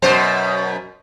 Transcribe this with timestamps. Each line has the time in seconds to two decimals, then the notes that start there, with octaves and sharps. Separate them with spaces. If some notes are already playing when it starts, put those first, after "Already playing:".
0.02 F#2 B2 C5